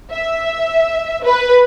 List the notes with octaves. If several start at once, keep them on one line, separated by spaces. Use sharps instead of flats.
E5
B4